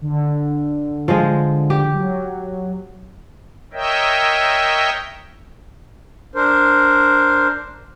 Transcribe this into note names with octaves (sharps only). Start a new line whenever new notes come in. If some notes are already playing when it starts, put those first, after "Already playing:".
D3
F3 G#3
G4
F#3
A#4 C#5 D#5 E5 G5
D4 A#4 C5